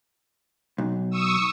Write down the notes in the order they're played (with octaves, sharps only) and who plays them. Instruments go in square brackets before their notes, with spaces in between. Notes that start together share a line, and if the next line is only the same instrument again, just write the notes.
[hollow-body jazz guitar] B1
[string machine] C#6 D#6 E6